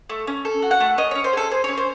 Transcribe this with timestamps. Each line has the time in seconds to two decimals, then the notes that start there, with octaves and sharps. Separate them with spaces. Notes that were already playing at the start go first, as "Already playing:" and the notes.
0.10 A3
0.27 C#4
0.45 A4
0.62 F#4
0.71 F#5
0.80 A3
0.98 C#4 D#5
1.11 C#4 C#5
1.24 C5
1.33 G#4 A4
1.51 G#4 C5
1.64 C#5
1.68 C#4
1.77 C5